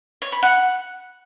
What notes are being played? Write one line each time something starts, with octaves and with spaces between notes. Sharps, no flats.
C#5
B5
F#5